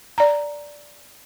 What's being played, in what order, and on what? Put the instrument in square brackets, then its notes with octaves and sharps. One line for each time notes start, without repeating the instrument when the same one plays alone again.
[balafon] D5 A#5